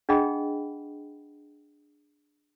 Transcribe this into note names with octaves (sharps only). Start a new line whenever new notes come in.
D4 G#4 D#5 F#5 G5 B5